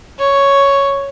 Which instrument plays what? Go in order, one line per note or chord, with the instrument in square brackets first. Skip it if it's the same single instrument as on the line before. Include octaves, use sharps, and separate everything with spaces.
[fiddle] C#5